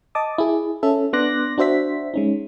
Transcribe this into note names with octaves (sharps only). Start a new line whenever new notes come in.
D#5 A5 D6 D#6
E4 G#4
C#4 A4 E5
B3 D4 C6 D6 F#6 A#6
D4 F#4 C5 E5 B6
G#3 C#4 D#4